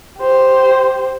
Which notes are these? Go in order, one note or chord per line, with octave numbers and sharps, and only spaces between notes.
G4 C5